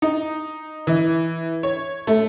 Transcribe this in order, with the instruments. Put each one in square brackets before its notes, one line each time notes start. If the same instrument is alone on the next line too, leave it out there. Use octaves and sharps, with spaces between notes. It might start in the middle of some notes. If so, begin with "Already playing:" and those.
[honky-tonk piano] D#4
E3
C#5
A3